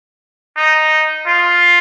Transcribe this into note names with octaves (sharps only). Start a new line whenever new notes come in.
D#4
F4